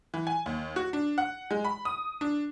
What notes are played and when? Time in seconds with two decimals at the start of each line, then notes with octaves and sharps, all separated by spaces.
0.14 E3
0.27 G#5
0.46 D#2
0.76 F#4
0.93 D4
1.18 F#5
1.51 G#3
1.65 B5
1.85 D#6
2.21 D4